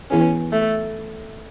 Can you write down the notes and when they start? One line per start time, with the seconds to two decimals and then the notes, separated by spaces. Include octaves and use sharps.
0.10 E3 B3 C#4 E4 G#4 B4
0.52 A3